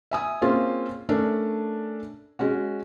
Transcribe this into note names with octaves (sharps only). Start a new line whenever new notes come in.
E5 G#5 D#6
A#3 C4 C#4 F4 G#4 C5
A3 C#4 D4 A#4 D5
G#3 C#4 F#4